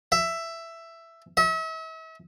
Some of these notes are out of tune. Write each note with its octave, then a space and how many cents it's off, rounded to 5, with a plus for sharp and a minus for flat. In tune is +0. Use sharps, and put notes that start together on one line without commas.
E5 +10
E5 -40